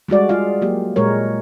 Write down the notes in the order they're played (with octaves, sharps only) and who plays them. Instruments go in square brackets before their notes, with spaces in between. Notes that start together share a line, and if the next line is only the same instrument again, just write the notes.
[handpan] G3 G#3 F#4 D5
F4 G#4 F5
F#3 A#3 G4
A#2 G#3 A#4 C#5